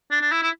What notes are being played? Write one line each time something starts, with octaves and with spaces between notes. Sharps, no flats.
D4
D4
E4
E4